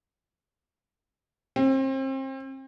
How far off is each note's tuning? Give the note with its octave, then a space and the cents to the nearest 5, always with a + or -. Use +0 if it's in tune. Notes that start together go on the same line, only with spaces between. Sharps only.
C4 +35